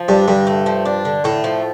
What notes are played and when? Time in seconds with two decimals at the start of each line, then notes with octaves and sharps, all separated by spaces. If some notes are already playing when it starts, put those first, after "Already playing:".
Already playing: F3
0.08 G2 D4
0.28 G2 D3
0.47 A3
0.66 F3
0.85 D4
1.05 D3
1.24 A2 A3
1.44 F3